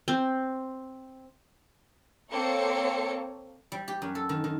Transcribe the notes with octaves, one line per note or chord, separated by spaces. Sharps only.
C4
A#3 C4 A4 C#5 C#7
G3
G4
F#2
A4
D#3
D#3